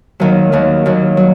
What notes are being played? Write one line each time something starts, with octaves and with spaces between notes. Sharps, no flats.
D#2 D#3 F#3
D#2 D#3 F#3
D#2 D#3 F#3
F#3